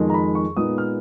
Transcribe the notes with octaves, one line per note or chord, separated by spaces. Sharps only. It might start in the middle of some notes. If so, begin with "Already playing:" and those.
Already playing: F2 D#3 G#3
A#5
B5
C#6
A#2 G#3 B3 D#4 D#6
F6